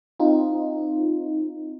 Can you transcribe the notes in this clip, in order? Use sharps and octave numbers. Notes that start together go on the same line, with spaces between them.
C4 D#4 F4